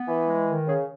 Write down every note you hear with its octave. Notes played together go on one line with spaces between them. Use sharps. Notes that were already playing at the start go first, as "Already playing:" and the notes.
Already playing: B3
E3
G#3
D#3
C#3 G#4